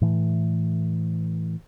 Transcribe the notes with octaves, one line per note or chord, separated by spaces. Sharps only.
A2 E3 A3